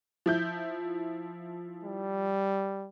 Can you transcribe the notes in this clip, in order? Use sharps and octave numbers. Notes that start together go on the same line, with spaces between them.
F3 E4 G6
G3